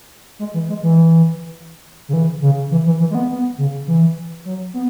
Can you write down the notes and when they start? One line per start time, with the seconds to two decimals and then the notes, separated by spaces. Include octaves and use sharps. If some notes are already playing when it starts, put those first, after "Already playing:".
0.39 G#3
0.54 E3
0.69 G#3
0.83 E3
2.09 C#3
2.13 E3
2.42 C#3
2.71 E3
2.86 E3
3.00 E3
3.11 G#3
3.15 B3
3.30 B3
3.58 C#3
3.87 E3
4.45 F#3
4.74 B3